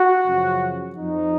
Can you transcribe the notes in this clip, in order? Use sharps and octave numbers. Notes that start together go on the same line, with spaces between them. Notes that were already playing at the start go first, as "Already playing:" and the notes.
Already playing: F#4
F#2 C#3 F3
F2 F3 D#4